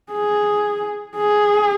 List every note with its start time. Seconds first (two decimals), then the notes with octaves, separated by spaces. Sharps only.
0.12 G#4
1.17 G#4